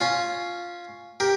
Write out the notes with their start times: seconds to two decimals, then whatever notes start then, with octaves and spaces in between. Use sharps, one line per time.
0.01 C#4 F4
1.20 G4 A#4